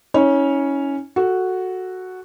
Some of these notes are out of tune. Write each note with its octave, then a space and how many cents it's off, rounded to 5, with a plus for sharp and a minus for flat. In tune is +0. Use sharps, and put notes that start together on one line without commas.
C#4 +0 E4 -45 C#5 +0
F#4 +0 A4 +0